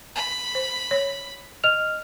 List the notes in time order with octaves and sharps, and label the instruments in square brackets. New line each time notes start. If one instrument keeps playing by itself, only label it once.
[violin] B5
[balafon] C5
C#5
[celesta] D#5 F6 F7